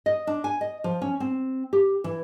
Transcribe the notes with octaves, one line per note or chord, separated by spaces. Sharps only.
D#5
D4
G#5
D#5
F3
C#4
C4
G4
E3